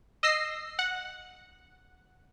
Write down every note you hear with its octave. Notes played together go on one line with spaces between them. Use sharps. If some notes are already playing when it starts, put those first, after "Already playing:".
D#5 E6 A#6 C7
F#5